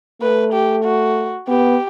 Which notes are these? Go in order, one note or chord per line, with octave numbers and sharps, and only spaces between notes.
A3 B4
G4
F#4
B3 G4